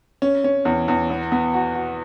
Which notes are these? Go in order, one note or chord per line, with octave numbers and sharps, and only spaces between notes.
C#4
C#4
E2
E2
B3
B3
F#4
F#4